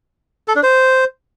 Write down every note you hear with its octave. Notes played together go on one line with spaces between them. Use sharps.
A4
D4
C5